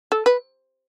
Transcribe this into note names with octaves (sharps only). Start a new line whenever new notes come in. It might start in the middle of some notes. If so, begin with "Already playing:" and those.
A4
B4